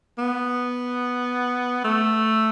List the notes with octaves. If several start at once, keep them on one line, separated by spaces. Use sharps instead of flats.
B3
A3